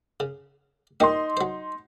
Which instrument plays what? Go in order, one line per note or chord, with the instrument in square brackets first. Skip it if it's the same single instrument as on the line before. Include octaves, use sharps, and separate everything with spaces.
[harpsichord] C#3
[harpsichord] A#2 G3 G4 [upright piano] D#4 C6
[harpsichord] F#3 C5